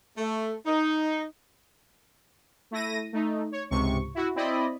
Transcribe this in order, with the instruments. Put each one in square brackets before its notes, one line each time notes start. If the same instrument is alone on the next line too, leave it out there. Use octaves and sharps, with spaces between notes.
[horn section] A3
D#4
[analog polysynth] A3 E4 A#6 D#7
A3 D#4
C#5
C#2 G#2 C3 C#6
E4 F#4
C4 E4 D5 D#5 B5